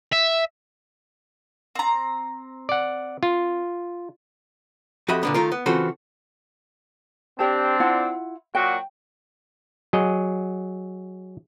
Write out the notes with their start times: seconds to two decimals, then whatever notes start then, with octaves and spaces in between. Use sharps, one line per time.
0.12 E5
1.75 C4 A#5
2.69 D5 F#5
3.23 F4
5.08 F2 F#4 G4 D#5 E5 B5
5.23 A#2 D3 B3
5.34 D#3 A3 F4 A#4
5.52 B3
5.66 C#3 E3 C4 F4 F#4 A4
7.39 C4 D4 G4 A5
7.80 E4 F4 F#5
8.55 A#2 F#3 F#4 G5
9.93 F#3 G#4 D#5